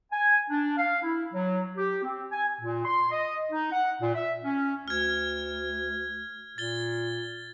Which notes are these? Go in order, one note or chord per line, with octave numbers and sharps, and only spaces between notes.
G#5
D4
F5
E4
F#3
G4
C4
G#5
A#2
C6
D#5
D#4
F#5
A#2
E5
C#4
D2 F6 G#6
A#2 A6 G7